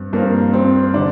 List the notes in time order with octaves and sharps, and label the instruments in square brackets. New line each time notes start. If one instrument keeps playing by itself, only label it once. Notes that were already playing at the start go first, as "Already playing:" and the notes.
Already playing: [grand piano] G2 C4
[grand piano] G2 F3 C4 F4 A#4 [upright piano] A#3
[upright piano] C4
[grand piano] D3 [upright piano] D4